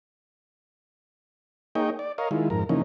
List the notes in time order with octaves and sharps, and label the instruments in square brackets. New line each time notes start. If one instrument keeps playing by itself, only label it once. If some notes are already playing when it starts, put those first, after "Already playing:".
[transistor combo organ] A#3 D#4 G#4 C#5 D#5 G5
D5
A#4 C#5 D#5 F5
D#3 G#3 E4 F4
F2 G#2 A#4
C#3 E3 F3 A#3 C#4 D#4